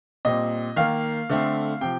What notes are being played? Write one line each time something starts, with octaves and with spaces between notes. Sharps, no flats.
A#2 G3 C4 D#5
D#3 A#3 F5
D3 A3 C4
C3 F3 G5